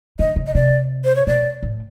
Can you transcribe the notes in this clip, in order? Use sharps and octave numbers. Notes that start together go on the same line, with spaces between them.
D3 D#5
C#3
D#5
C3 D5
C5
C#5
B2 D5
A2